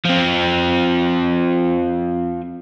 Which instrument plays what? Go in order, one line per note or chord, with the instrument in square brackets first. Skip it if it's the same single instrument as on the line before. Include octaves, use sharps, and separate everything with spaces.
[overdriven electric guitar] F3 C4